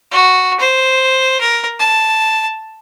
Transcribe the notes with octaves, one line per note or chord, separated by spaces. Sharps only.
F#4
C5
A#4
A5